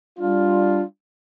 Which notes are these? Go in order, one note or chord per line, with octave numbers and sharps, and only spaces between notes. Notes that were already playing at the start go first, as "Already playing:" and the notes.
G3 D4 F4